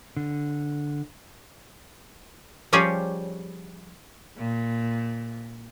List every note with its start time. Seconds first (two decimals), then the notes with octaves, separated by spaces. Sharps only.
0.17 D3
2.73 F3 G3 C#4 G4 G#4 C#5
4.37 A#2